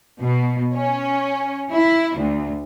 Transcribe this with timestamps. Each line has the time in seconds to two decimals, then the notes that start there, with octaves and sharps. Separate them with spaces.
0.21 B2
0.75 C#4
1.72 E4
2.18 D2